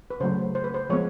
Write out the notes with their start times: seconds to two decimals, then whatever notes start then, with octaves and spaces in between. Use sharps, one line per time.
0.10 B4
0.20 C#3 F#3 A3 C5
0.55 C5
0.64 B4
0.74 C5
0.90 F3 G#3 B3 C#5